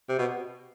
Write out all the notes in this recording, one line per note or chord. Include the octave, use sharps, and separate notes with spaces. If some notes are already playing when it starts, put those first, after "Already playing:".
C3
B2